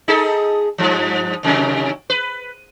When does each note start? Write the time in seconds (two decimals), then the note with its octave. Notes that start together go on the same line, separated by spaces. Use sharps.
0.08 D#4 G#4 A4
0.78 G2 F3
1.43 D#2 C3 F#3
2.10 B4